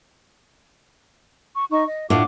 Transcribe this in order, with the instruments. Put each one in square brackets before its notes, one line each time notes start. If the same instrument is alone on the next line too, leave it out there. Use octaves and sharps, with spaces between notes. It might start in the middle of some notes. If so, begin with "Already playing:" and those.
[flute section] C#6
D#4 D#5 C#6
D#5
[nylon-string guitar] A2 D4 F4 [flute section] F#5 D6